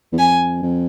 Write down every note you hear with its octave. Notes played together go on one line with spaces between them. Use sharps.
E2
F2 G#5
F2